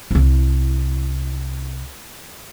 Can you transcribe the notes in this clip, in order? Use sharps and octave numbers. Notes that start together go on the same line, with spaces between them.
C2 E4